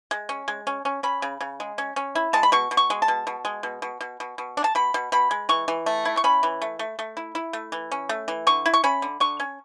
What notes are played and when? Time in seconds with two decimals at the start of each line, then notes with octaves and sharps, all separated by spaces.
0.11 G#3
0.29 C#4
0.48 G#3
0.67 C#4
0.85 C#4
1.03 C#4 B5
1.22 C#3
1.41 C#3
1.60 G#3
1.78 C#4
1.96 C#4
2.15 E4
2.33 G#3 A5
2.43 B5
2.52 B2 C#6
2.71 B2
2.77 C#6
2.90 G#3
3.02 A5
3.08 B2
3.27 B2
3.45 G#3
3.63 B2
3.82 B2
4.01 B2
4.20 B2
4.38 B2
4.57 D4
4.64 A5
4.75 B2 B5
4.94 B2
5.12 B2 B5
5.31 G#3
5.49 E3 C#6
5.68 E3
5.86 A3
6.05 E4
6.17 C#6
6.24 C#4 B5
6.43 E3
6.62 A3
6.79 A3
6.99 A3
7.17 E4
7.35 E4
7.53 A3
7.72 E3
7.92 C#4
8.09 A3
8.28 E3
8.47 D3 C#6
8.66 E4
8.74 C#6
8.84 C#4 B5
9.02 D3
9.20 D3 C#6
9.40 C#4